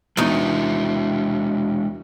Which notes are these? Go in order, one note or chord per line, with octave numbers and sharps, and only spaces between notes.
E2 G#3 D4 D#4 F#4